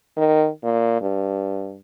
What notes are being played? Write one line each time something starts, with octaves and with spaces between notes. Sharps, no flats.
D#3
A#2
G2